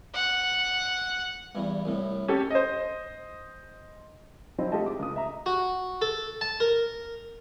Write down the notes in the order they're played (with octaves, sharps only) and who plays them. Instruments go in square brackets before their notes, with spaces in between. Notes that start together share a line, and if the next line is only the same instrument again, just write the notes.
[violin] F#5
[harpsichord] E2 G2
C2 A2
[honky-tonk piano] C#4 G4 A4
[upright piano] C5 D#5
[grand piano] F3 F#3 C4 D#4 E4 D#5
G#3 A3 F4 G4 D#5 A5
D6
C#2 D#6
E5 A#5
[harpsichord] F#4
A4
A5
A#4